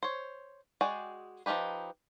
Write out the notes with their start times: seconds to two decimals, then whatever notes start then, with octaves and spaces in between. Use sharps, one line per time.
0.03 C5 C#5
0.81 G#3 F#4 G#4 D5 G5
1.46 F3 C4 D#4 G4 B4